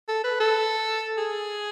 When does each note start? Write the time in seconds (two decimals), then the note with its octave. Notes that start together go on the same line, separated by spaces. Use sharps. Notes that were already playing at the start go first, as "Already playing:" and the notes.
0.08 A4
0.24 B4
0.40 A4
1.18 G#4